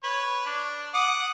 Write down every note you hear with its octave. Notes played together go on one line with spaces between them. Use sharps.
B4 C#5
D4
F#5 D6 D#6